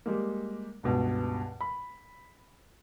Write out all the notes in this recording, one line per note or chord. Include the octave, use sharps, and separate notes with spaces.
G3 G#3 A#3
C#2 G2 B2
B5